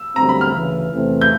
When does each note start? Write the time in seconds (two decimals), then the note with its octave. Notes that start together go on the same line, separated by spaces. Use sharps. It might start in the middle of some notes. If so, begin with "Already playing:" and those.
Already playing: E6
0.16 F#2 D3 G3 C4 A#5
0.29 B5
0.41 F6
0.54 D2 C#3 E3
0.92 E2 C3 E3 A3 C4
1.21 G6